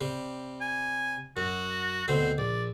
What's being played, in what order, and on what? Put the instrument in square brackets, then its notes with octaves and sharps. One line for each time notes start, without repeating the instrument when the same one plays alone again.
[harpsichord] C3 G3
[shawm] G#5
[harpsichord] F#2 [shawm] F#4
[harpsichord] D2 B2 C4 [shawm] C5
[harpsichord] A#1 [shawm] D5